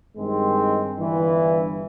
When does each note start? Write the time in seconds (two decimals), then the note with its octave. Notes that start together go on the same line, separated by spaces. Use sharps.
0.17 G2 D#3 G#3 C4
0.96 G1 G2 E3